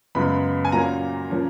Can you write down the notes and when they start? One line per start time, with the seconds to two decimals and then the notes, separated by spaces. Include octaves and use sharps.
0.15 F#2 C#3 G#3 B3 B5
0.65 G#5
0.72 A#2 F#3 A#3 C#4 A#5
1.30 F3 A#3 C#4